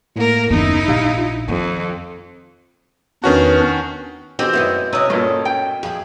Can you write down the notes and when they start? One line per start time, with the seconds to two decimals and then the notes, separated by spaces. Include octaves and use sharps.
0.16 A2 A#3 A#4
0.51 F#1 D#2 B3 D#4 E4
0.88 A#1 G4 F5
1.18 F4
1.48 F2 D#3
3.24 E2 D#3 C#4 D4 F#4 B4
4.39 B2 D#3 G#3 C4 G4
4.53 F#2 B3 D#4 E4 C#5
4.93 C3 C#4 D#5
5.10 G2 A#2 A3
5.45 G5
5.83 F2 G#4 B5